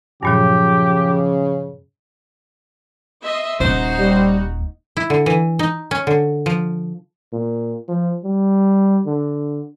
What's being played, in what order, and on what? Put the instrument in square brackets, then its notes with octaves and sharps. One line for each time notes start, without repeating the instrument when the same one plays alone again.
[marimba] G2 A#2 F#3 [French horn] C#3 [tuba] F3 [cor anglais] G4
[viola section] D#5 E5 C6
[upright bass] D#1 [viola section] D#4 F#4 [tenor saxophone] C5
[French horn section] G3
[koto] E4
D3
E3
D#4
C#4
D3
F3
[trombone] A#2
F3
G3
D3